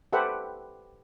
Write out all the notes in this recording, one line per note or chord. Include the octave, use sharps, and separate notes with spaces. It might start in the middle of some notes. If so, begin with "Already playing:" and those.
G4 A4 B4 C5 E5 F#5